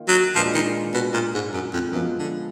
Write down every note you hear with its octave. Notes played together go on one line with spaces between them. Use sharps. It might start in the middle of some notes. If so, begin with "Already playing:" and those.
Already playing: D#3 A#3 F4
F#3
A#2 F3 G#3 D4 F4 B4
D#3
B2
A#2
G#2
F#2
F2
F#2 F3 G#3 B3 F4
D3